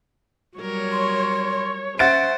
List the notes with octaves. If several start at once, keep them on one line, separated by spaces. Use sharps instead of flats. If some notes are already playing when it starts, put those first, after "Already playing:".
F#3 G3 A#4 C#5
C6
C#4 C5 E5 F#5 A6 D7